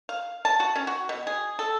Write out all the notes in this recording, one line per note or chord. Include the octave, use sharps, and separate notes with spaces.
F5
A5
F#4
C#4
F#4
B2
G#4
A4